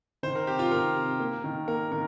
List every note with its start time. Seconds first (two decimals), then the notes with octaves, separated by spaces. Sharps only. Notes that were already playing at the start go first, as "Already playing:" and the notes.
0.23 D#3 C5
0.35 A#4
0.47 C3 G4
0.59 F4
0.71 D#3 A#4
0.95 C3
1.19 A#3
1.44 D#3
1.68 A#3 A#4
1.91 D#3 A#4